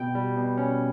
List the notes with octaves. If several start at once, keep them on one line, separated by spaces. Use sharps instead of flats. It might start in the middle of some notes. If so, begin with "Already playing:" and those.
Already playing: B2 G5
G3
B2
C#4